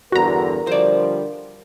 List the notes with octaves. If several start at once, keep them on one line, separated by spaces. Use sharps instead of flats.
E2 G2 D3 F#4 A#4 A#5
D3 F3 G3 C5 D5